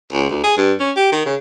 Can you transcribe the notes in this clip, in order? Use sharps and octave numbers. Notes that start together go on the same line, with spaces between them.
C#2
D2
G#4
G2
C#4
G4
D#3
C#3